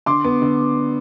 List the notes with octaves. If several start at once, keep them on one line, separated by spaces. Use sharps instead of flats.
D3 C6 D6
B3
D3